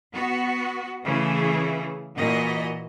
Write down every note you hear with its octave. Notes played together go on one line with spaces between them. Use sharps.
B3 F#4
C#3 E3 A3 G#4
A#2 E3 F#4 D#5